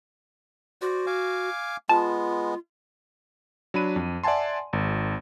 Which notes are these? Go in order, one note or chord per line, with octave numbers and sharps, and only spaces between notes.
F#4 C5 D5
F5 G#5 D6
G#3 B3 F4 A5
F#3 D4 B5 D#7
F2
D5 E5 F#5 G#5 A5 C6
G#1